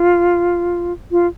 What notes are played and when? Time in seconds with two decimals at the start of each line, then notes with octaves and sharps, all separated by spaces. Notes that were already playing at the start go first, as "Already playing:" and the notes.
Already playing: F4
1.12 F4